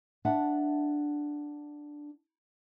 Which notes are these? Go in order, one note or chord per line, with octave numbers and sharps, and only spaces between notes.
D4 E5 F#5 A5